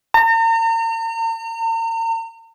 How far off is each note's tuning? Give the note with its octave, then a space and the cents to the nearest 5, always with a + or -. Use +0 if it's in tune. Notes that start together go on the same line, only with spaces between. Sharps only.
A#5 -40